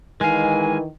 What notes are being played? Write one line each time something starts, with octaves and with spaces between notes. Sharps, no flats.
D#3 E3 G#3 F5 G#5